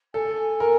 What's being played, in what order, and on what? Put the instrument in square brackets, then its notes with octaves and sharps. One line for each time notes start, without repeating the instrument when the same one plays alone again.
[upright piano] A4 [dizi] G#5
[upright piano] A#4